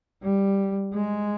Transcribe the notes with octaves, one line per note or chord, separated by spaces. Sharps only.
G3
G#3